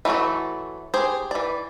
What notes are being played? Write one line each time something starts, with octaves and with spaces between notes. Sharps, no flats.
E3 F#3 A3 F#4 A4
G4 G#4 C5
E3 D5